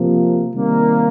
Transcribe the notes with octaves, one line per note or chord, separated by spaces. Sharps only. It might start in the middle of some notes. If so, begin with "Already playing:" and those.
Already playing: C3 F3 A#3
C3 D#3 G3 A#3